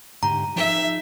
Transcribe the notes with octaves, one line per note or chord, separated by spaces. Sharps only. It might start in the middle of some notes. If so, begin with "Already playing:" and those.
G#2 D3 G4 A#5
F3 D#4 G#4 E5